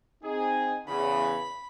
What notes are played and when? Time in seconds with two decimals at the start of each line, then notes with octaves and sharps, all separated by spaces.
0.23 C4 D#4 G#4
0.88 E2 C#3 B5